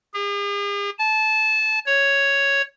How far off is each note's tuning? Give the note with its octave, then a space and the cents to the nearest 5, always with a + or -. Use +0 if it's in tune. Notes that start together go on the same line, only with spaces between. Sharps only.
G#4 -45
A5 -20
C#5 +0